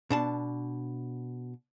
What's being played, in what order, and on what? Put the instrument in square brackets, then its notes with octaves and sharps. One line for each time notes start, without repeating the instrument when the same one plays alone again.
[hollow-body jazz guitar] B2 D4 A5